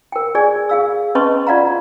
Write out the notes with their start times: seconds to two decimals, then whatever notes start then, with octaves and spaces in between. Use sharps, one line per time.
0.12 A#4 G5
0.35 G#4 D5 G#5
0.69 G#4 F5 E6
1.15 C#4 B4 D#5 A5 C6 C#6
1.47 F4 D5 F5 F#5 A#5